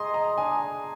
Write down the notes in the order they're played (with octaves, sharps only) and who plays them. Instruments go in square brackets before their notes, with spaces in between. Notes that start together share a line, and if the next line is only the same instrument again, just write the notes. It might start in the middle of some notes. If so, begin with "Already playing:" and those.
Already playing: [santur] G#4 D#5 [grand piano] A#5 C6
[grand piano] A#5
[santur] D4 [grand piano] G#5